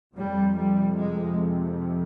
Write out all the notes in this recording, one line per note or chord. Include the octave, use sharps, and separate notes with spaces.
F2 C3 G3
G3
G#3